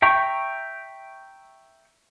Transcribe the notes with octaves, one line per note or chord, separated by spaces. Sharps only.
E5 G5 A#5 C#6